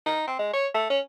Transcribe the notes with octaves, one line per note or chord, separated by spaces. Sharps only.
D#4
C4
G#3
C#5
A3
C#4